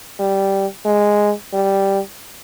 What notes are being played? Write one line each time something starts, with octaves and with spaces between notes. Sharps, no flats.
G3
G#3
G3